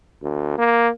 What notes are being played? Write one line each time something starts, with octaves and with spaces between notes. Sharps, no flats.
D2
A#3